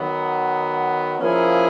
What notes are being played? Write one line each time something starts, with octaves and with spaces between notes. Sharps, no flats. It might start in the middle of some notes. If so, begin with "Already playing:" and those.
Already playing: D#3 F#3 B3
F3 A#3 C#4 E4 G#4